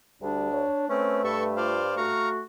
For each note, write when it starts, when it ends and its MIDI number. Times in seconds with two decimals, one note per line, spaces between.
0.22 0.64 38
0.22 0.48 55
0.22 0.86 62
0.52 0.86 73
0.90 1.80 57
0.90 1.21 60
0.90 1.23 61
0.90 1.48 71
1.24 2.09 43
1.24 1.44 69
1.24 1.44 76
1.24 1.44 85
1.57 1.84 65
1.57 1.95 72
1.57 1.95 74
1.57 1.95 77
1.97 2.43 57
1.97 2.41 66
1.97 2.29 77
1.97 2.29 82
1.97 2.29 85